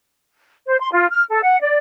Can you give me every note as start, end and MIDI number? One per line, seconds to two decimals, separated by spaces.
0.67 0.77 72
0.79 0.90 84
0.92 1.07 65
1.10 1.23 89
1.30 1.41 69
1.43 1.56 78
1.62 1.78 74